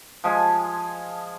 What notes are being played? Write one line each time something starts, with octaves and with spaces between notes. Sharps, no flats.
F3 G#3 G#5